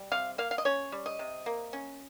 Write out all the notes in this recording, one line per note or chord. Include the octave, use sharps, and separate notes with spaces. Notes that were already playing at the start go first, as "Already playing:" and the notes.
Already playing: G3
C3 F5
A#3 F5
F5
D#5
C#4 C#5
G3
D#5
C3
A#3
C#4